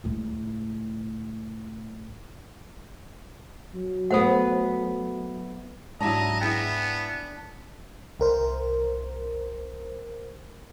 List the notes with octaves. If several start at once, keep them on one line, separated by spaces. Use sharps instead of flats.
C#2 A2
F#3
A3 B3 A4 C5 F#5
G#2 F#3 D4 E4 D#5 A#5
B3 E4 G#4 G5
C2 A#4 C5